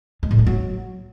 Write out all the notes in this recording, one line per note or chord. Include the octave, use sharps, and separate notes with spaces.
G#3
A2
A3
F#3